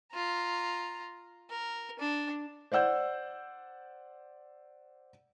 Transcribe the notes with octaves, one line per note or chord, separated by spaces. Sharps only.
F4 A#5
A#4
D4
C5 D5 F#5 E6 G6